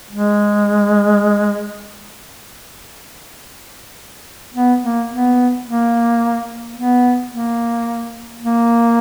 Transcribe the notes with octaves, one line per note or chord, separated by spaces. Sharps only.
G#3
B3
A#3
B3
A#3
B3
A#3
A#3